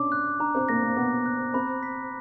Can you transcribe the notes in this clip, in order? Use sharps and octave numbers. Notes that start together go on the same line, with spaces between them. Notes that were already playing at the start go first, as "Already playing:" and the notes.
Already playing: C#4 D4 D6
F#6
D4 A#5
C4
A#3 A#6
A#3
B3 D6
F#6
C4 B5
B6